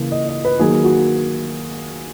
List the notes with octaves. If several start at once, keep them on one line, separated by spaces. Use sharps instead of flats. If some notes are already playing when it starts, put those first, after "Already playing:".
Already playing: C#3 E3 A#3
D#5
D#5
B4
D#3 F#3 A#3 G#4
F#4